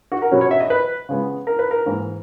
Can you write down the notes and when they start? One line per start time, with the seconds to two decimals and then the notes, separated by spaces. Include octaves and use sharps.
0.12 F#4
0.22 A#4
0.31 B2 F#3 C#4
0.41 C#5
0.51 E5
0.60 D#5
0.70 B4
1.09 C#3 G#3 B3
1.47 A#4
1.59 B4
1.71 A#4
1.86 G#2 E3 A#3